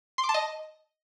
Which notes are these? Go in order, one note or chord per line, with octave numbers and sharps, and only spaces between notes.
C6
D6
A5
D#5